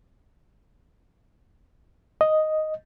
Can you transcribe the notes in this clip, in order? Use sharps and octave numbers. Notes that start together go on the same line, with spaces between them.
D#5